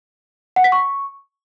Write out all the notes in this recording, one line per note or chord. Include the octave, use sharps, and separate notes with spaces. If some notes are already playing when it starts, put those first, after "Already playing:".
F#5
B6
C#6